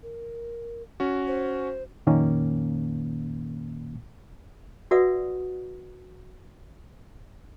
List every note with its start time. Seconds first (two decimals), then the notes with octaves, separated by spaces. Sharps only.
0.03 A#4
1.00 C#4 F#4
1.27 C5
2.07 F2 A#2 D#3 A#3 C#4
4.91 F#4 B4 D5 E5 F#5 D#6